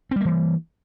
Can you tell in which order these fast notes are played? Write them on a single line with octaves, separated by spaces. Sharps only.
C4 G3 A#3 E3